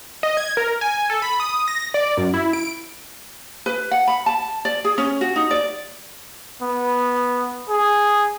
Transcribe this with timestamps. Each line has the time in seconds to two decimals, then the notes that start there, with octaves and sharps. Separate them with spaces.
0.23 D#5
0.37 G#6
0.57 A#4
0.81 G#5
1.10 A4
1.22 B5
1.40 D#6
1.68 A#6
1.94 D5
2.17 F#2
2.34 E4
2.53 D7
3.66 B4
3.91 F#5
4.07 B5
4.26 A5
4.65 D5
4.85 G#4
4.98 C#4
5.21 F#4
5.36 D#4
5.51 D5
6.62 B3
7.69 G#4